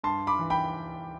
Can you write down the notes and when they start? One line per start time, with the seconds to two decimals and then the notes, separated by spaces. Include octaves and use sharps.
0.03 G2 A5 C6
0.27 B5 D6
0.39 E3
0.50 G5 B5